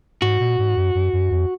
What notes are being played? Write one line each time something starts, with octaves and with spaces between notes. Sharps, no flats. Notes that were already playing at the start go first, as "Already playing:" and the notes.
G#2 F#4
A#2
G#2
F#2
F#2
F#2
F2